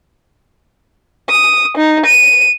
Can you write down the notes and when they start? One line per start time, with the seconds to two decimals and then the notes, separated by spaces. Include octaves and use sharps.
1.30 D#6
1.78 D#4
2.06 D#7